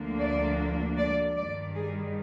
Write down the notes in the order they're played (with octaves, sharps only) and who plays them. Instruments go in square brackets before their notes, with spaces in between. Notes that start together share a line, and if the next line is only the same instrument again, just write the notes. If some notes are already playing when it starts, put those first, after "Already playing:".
Already playing: [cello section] D2 D3 F3 A#3 D4
D5
D5
G2 D#3 G3 D5
G#4